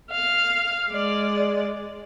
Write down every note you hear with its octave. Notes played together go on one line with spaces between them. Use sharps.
F5
G#3 D5